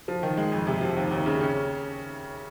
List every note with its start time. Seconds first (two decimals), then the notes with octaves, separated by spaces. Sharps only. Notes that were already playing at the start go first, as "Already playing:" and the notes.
0.08 F3
0.23 D#3
0.37 G#3
0.52 F2
0.67 C3
0.81 F3
0.96 D#2
1.11 D#2
1.26 C#3
1.41 C#4